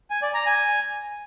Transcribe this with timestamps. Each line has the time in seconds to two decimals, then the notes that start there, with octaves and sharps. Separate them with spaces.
0.10 G#5
0.22 D5
0.34 A#5
0.46 G#5